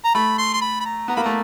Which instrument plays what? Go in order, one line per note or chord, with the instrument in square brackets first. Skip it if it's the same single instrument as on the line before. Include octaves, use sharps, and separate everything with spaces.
[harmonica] A#5
[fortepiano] A3 [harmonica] B5
[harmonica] C6
C6
B5
B5
A#5
[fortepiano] B3 [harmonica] A#5
[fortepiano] A#3 [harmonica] B5
[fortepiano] A3 [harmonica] A#5